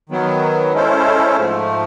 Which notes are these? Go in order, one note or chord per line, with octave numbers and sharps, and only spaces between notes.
D#3 F#3 B3
G#3 C#4 E4 A4 C5
G#2 F3 A3